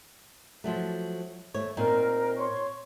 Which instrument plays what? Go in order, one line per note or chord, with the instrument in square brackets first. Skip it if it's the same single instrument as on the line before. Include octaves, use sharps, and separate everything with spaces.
[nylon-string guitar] F3 F#3 A3
D#2 A3 C#5
[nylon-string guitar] A#2 C4 D#4 [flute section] A#4
[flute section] C#5 C6 C#6